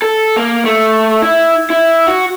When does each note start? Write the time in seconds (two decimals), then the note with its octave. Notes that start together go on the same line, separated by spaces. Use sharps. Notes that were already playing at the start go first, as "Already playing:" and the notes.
0.02 A4
0.36 A#3
0.65 A3
1.22 E4
1.70 E4
2.08 F#4